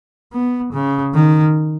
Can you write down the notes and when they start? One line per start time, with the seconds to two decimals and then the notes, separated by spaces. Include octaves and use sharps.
0.33 B3
0.73 C#3
1.14 D#3